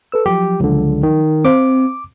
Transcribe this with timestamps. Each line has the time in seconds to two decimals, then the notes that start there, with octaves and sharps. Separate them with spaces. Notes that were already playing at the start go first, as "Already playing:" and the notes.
0.12 A4 B4 E6
0.26 F3 F#3 G4
0.60 C#2 D3
1.03 D#3
1.45 C4 C5 F5 D6